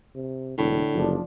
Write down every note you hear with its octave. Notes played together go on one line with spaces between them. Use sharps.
C3
E1 A2 D3
F#1 F3 D4